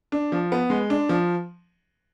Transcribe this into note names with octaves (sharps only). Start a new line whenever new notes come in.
D4
F3
B3
G#3
D4
F3